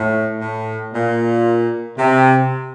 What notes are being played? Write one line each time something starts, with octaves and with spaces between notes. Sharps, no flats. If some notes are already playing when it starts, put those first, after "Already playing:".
Already playing: A2
A2
A#2
C3